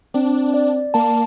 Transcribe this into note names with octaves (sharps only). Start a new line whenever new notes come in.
C4 D4
D5
A#3 A5